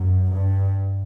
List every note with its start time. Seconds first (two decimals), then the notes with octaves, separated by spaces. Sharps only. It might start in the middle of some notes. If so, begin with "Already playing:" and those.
Already playing: F#2
0.31 G2